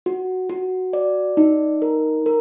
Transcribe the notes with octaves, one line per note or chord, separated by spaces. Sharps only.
F#4
F#4
D5
D#4
A#4
A#4